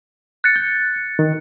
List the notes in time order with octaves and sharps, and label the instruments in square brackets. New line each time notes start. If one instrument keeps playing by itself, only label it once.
[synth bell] F#6 A6 C#7
[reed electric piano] G6
D#3